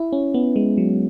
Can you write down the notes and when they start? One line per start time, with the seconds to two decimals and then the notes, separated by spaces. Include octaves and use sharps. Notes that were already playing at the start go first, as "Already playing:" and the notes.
Already playing: E4
0.13 C#4
0.34 B3
0.56 G#3
0.78 F#3